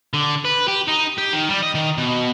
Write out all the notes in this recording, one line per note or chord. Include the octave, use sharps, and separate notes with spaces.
D3
B4
G4
D#4
G4
D#3
G3
D#5
D#3
B2